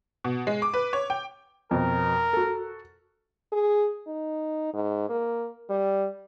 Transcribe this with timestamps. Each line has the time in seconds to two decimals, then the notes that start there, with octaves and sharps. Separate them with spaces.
0.24 B2
0.47 G#3
0.62 D6
0.74 B4
0.93 C#5
1.10 G5
1.71 F2 B2 A#4
2.33 F#4 A4
3.52 G#4
4.07 D#4
4.74 G#2
5.09 A#3
5.70 G3